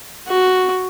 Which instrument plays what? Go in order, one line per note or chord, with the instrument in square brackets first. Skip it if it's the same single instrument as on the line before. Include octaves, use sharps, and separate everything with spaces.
[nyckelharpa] F#4